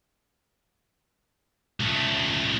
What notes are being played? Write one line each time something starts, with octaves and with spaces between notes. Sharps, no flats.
C#2 A3